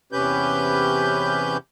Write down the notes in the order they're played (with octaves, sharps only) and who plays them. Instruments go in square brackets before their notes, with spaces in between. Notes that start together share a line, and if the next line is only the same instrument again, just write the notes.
[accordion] E2 C3 C#4 G4 B4 G6